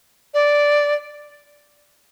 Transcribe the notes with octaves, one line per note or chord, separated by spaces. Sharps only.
D5